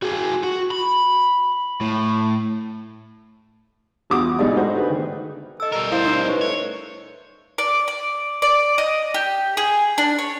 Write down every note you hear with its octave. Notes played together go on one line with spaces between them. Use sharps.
F#4 G#4
F#4
B5
A2
E2 G3 F4 F#4 D6 D#6
G#2 B2 G3 D#4 G#4 D5
G3 A3 D#4 F#4 C5
D#4 G#4 B4
D#3
A4 D#5 E6
G3 A#4
E4 C5 F5 E6
D#4 D#5
C#4 B4
A3 C#5
D5
D5
D5
D#5
G4
G#4
D4
C#5